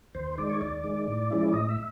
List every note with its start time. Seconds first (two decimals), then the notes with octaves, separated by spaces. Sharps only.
0.15 D#2 C5
0.38 D#3 G#3 D5
0.50 C#5
0.61 D#2 D5
0.84 D#3 G#3
1.07 A2
1.31 F3 G#3 C#4 E4
1.48 D5
1.53 A2 D#5
1.69 E5